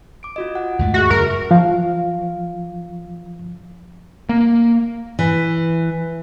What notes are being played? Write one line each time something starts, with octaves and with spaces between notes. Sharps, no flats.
D6 D7
F4 F#4 D#5
F#5
D#2 G#2 A3
F#4 G#4 E5
F#2 C#3 A#4
F3 F5
A#3
E3